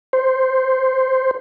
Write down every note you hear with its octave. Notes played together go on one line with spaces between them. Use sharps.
C5